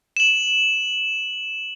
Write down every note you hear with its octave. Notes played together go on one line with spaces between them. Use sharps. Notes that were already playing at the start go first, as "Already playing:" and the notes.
E7 F#7